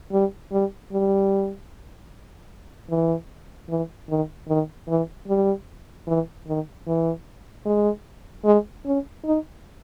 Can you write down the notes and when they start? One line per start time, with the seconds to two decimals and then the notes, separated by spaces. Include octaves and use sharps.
0.12 G3
0.52 G3
0.92 G3
2.90 E3
3.69 E3
4.09 D#3
4.48 D#3
4.88 E3
5.28 G3
6.07 E3
6.47 D#3
6.87 E3
7.66 G#3
8.45 G#3
8.86 C#4
9.25 D#4